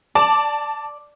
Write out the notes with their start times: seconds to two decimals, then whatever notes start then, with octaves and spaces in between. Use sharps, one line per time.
0.15 D5 A5